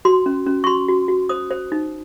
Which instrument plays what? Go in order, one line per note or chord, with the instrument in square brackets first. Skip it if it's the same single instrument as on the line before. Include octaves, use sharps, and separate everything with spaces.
[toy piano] F#4 C6
C#4
C#4
C#6
F#4 C6
F#4
F#4
C5 D#6
C5
D#4